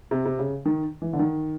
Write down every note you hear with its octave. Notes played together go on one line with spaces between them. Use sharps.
C3
C3
C#3
D#3
E3
D3
D#3